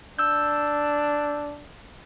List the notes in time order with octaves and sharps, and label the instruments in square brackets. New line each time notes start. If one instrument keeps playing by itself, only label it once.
[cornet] D4 [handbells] E6 G6